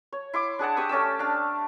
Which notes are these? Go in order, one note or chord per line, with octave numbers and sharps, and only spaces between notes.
C#5
E4 C6 D6
D4 G#4 F#5 A5
G4 C#6 D#6 E6
A3 C#4 D5 E6
D4 F5